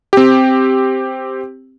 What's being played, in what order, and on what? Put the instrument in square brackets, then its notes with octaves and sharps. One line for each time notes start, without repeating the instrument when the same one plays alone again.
[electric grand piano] C4 G4